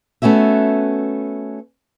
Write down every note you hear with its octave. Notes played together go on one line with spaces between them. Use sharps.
A3 B3 C#4 F#4 E5